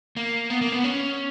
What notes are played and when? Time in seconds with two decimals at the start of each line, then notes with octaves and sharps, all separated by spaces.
0.17 A#3
0.50 B3
0.61 A#3
0.72 B3
0.84 C#4